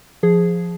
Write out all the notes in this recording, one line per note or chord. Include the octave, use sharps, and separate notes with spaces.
F3 G#4